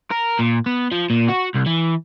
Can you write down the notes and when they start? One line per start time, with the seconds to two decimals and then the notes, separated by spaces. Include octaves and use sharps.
0.11 A#4
0.39 A#2
0.66 B3
0.92 F3
1.10 A#2
1.29 F#4
1.55 C2
1.67 E3